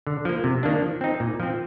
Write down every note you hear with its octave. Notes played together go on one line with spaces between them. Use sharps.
D3
F3 A#3
C3
D#3 A#3 D4
F3
C4 D#4
A#2
F3 C4